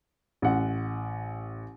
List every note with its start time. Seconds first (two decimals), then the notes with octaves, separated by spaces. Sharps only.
0.42 A1 F#5